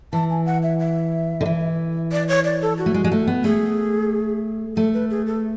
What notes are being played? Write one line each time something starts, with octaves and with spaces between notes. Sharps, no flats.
E3 A5
G#5
F#5
E5
E5
D3
E3
D5
C#5
D5
A4
F#4
A3
G#3
G#3
A3
B3
A3 G#4
A3 A4
B4
G#4
A4